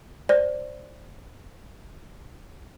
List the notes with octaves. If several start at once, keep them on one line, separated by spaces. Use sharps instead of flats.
C5 D5